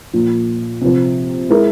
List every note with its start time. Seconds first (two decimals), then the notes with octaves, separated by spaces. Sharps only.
0.13 A#2 F3 A#3
0.81 C3 F3 C4
1.50 G#3 E4 A#4